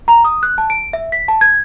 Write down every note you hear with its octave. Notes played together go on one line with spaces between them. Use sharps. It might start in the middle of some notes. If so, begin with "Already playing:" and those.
A#5
D#6
F#6
A5
D7
E5
B6
A5
G#6